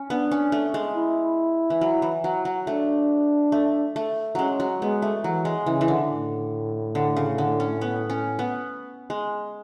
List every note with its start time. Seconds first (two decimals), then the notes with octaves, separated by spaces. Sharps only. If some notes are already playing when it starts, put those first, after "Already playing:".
Already playing: C#4
0.10 B3 D4
0.31 C#4
0.52 A3
0.74 G#3
0.96 E4
1.70 E3
1.81 F#3
2.02 E3
2.24 F#3
2.45 F#3
2.67 A3 D4
3.52 A3
3.96 A3
4.35 F#3 G#3 C#4
4.60 F#3
4.81 G#3 B3
5.02 A3
5.24 E3 F#3
5.45 G#3
5.66 C#3 E3
5.81 E3
5.88 D3
6.11 A2
6.95 D3
7.16 C#3
7.38 D3
7.60 C#4
7.81 B3
8.10 C#4
8.39 B3
9.10 G#3